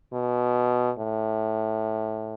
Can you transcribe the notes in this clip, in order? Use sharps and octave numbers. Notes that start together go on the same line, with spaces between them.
B2
A2